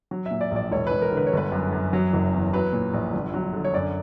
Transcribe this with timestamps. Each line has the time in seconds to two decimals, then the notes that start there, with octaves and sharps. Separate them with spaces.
0.11 F#3
0.26 A#2 E5
0.41 D5
0.51 A#1 D5
0.71 E1 C#5
0.87 E1 B4
1.02 A#4
1.12 D3
1.17 B4
1.27 C#5
1.33 G1 B4
1.52 F#2
1.73 F#2
1.93 F#3
2.13 F#1
2.33 E2
2.53 F#3 B4
2.73 A#2
2.94 A#1
3.13 G1
3.34 F#3
3.53 D3
3.64 C#5
3.73 F#2 D5